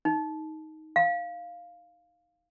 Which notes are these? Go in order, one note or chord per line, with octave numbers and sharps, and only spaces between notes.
D#4
F5